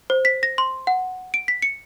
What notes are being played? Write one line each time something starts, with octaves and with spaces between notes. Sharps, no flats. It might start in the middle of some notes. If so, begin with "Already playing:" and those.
C5
B6
A#6
C6
F#5
D7
B6
C#7